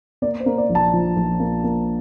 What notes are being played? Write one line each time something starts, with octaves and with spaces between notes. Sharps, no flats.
A#3 D5
C5
A#3
D5
A#1
A5
F3
A#1
A#3
A#3